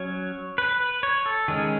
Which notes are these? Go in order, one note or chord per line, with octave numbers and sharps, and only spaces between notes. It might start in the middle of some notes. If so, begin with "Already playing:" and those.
Already playing: F#3 C#4 C#5
B4
B4
C#5
A4
D#3 G#3 C#4 G#4